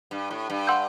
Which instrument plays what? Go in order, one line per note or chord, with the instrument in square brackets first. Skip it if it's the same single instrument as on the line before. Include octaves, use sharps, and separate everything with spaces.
[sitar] G2
A2
G2
[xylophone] F#5 C6 E6 G6